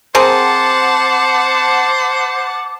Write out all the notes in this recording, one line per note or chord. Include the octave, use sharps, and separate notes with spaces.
C4 G#4 A#4 C5 F#5 A5 D6